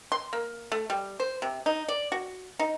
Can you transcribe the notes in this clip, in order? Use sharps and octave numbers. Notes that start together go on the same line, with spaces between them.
C6
A#3
A3
G3
C5
C3
D#4
D5
F#4
D#4